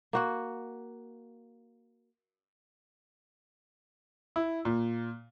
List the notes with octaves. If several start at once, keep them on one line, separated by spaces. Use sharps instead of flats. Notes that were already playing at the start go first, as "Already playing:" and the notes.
A#3 F#4 F#5
E4
A#2